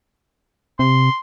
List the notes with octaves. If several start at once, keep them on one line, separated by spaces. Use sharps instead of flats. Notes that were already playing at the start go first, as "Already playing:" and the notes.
C3 C6